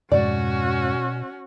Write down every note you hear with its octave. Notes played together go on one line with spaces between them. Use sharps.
F2 G#2 B2 G#3 C#4 F#4 D5